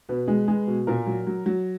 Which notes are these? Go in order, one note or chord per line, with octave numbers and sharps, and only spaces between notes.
B2 B4
G#3
G#3
B2
A#2 A#4
F#3
F#3
F#3